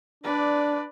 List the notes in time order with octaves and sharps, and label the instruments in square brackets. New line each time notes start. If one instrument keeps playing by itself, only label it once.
[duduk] D4 [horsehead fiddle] B4 D5